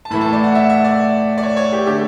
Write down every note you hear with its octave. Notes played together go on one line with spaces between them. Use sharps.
A5
A2 E3 A3 B5
A5
D5
F#5
E5
E5
D5
D5
C#5
C#5
G4
D3 A3 G4